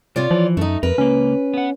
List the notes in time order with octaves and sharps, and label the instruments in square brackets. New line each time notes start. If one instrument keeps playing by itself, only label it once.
[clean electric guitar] C3 [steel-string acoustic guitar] F4 C#5 D5
[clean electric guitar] E3 [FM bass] F3
[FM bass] F#2 [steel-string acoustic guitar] A3 D#4
[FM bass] F2 [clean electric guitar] A#4 [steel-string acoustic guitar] B4
[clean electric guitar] C#2 A#3 [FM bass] C#4
[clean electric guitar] B3 F#5